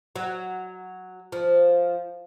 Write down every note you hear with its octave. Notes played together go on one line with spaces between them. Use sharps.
F#3
F3